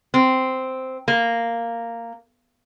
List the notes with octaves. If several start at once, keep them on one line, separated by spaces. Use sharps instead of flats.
C4
A#3